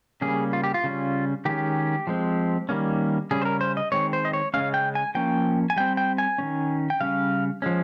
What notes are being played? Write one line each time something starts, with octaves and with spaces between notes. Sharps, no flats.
C#3 G3 A#3 C#4 G#4
F4
G4
F4
C#3 G3 C#4
D#3 G#3 C#4 G4
F3 G#3 C4
D#3 G3 A#3 C#4
C#3 G3 C#4 G#4
C5
A#4
C5
D#5
D#3 G#3 C4 C#5
C5
D#5
C#5
C#3 G#3 C#4 F5
G5
G#5
F3 A#3 C#4 G5
G#5
G3 C4 G5
G5
G#5
D#3 G#3 C#4
G5
C#3 G3 C#4 F5
F3 G#3 C#4